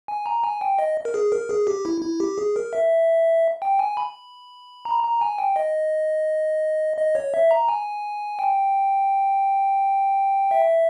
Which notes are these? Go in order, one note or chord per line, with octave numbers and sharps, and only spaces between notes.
G#5
A#5
G#5
G5
D#5
A#4
G#4
A#4
G#4
G4
E4
E4
G4
G#4
A#4
E5
G5
G#5
B5
A#5
A#5
G#5
G5
D#5
D#5
C#5
E5
A#5
G#5
G5
E5